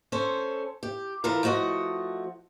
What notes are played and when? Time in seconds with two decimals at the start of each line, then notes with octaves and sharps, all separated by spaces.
0.12 C#4 A4 C5
0.83 G4
1.24 E3 F4 A4 A#4
1.43 F3 A3 F#4 D#5 F#5